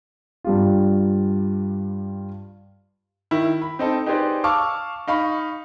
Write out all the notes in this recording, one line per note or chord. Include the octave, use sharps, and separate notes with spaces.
G2 G3 F4
D#3 E4
B5
C4 D#4 A4
D#4 G4 G#4 B4 C5 D5
F5 A5 C#6 D6 E6 F6
D#4 F5 B5 C#6